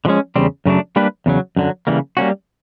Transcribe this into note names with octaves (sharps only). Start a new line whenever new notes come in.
D3 F3 G#3 C#4
E2 C#3 G3 C4
F#2 C#3 F#3 A3 D4
G3 A#3 D4 G4 B4
E2 C#3 F#3
F#2 D3 F#3
C#3 E3 G3 A#3
G3 A#3 C#4 F#4